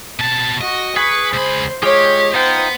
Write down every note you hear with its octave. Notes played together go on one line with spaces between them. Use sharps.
B2 A5
F#4 D#5
G#4 B4 G#5 C#6
C#2 C5 B5
G#3 F4 G4 G#4 C#5
B3 D#4 F4 C5 G5